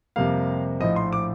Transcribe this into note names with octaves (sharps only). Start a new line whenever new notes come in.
F2 C3 G3 A#3 F5
A#1 A2 F3 D#5
C6
D6